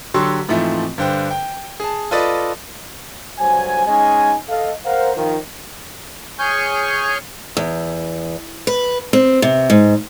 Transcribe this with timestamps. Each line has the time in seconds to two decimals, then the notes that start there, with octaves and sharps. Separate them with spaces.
0.14 D3 F#3 G4 C6 C#6 E6
0.49 G#2 E3 F3 A3 C4
0.98 G2 D3 C5 G5
1.31 G5
1.80 G#4 A5
2.11 F4 A4 B4 D5 D#5
3.39 D2 G2 F#3 C5 G#5
3.87 G#3 C#4 D#4 D#5 G#5
4.50 A4 D#5 F5
4.85 A#4 C5 F5 F#5
5.16 D#3 F3
6.39 G#4 C#5 G#5 C#6 F6 G6
7.57 E2
8.67 B4
9.13 C4
9.42 C3
9.70 G#2